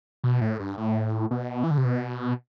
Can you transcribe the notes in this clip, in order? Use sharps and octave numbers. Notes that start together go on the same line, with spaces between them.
B2
A2
G2
A2
B2
E3
D3
C3
B2